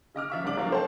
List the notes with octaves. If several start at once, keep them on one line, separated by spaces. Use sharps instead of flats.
C#3 D#5 D6 F6
F3 E5 C#6
C2 G2 C#3 D5 D6 F#7
F3 F#3 A#3 F4 A#4
A4 C5 G5 A5